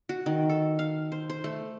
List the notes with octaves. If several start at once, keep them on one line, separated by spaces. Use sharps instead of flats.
F#4
D#3
A4
F5
C5
C5
A3